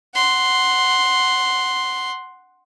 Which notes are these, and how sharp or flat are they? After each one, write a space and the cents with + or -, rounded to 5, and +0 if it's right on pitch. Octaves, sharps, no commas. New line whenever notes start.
F#5 +0 C6 +0